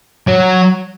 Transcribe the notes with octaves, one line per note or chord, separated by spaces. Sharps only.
F#3